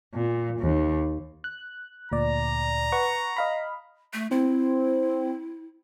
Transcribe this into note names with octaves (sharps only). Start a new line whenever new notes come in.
A#2
D#2
F#6
D2 A#2 D5 A#5
B4 F#5 C#6
D#5 F5 B5
A3
C4 E4